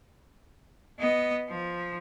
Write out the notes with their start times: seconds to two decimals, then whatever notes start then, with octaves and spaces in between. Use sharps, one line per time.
0.99 B3 D#5
1.49 F3